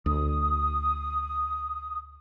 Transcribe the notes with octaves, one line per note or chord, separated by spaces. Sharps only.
D2 D#6